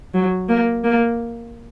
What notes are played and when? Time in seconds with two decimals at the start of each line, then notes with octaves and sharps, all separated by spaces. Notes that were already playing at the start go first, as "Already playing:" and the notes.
0.14 F#3
0.49 A#3
0.84 A#3